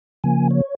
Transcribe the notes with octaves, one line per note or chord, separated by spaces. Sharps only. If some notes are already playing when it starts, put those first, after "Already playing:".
C#3 F3 A#3 G#5
C#5